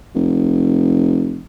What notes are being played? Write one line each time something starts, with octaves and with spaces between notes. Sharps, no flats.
F1